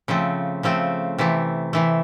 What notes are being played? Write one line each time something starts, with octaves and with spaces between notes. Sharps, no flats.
C#3 F3 A3 C4
C#3 F3 A3 C4
C3 E3 A3
C3 E3 A3